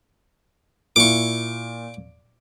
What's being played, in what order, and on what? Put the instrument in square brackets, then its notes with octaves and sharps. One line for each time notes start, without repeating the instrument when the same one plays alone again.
[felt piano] A#2 E4 [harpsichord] C#6 D6